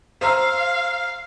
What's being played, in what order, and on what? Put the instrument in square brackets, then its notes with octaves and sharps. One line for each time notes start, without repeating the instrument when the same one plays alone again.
[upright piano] C5 A#5 E6 [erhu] F5